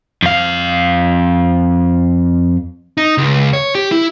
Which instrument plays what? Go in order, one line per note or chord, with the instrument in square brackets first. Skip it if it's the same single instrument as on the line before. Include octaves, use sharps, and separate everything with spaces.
[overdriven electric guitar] F2 F5
[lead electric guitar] D#4
C#2
C#5
G4
E4